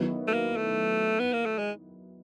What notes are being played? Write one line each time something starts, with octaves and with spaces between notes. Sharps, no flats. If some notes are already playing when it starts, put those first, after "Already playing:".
Already playing: D#3 F#3 B3 E4
A3
A#3
A3
B3
A#3
A3
G#3